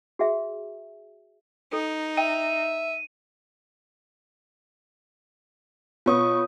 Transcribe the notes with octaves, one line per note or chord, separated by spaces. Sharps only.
F#4 G#4 E5
D#4 A4
E5 G5 D#7
B2 B3 F4 C#5 C#6 D#6